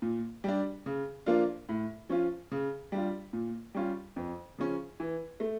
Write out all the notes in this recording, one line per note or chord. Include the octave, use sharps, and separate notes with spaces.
A#2
G3 D4
C#3
F3 A#3 D4 F4
A2
F3 C#4 F4
C#3
G3 D4 F4
A#2
G3 C#4 F4
F2
C#3 F3 C#4
E3
A3